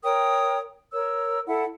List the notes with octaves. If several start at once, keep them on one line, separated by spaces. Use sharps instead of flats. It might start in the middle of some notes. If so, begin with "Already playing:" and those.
A#4 C#5 G5 D#6
A#4 C#5 E6
E4 A4 E5 F#5